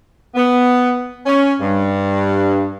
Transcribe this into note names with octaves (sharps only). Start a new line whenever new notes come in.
B3
C#4
G2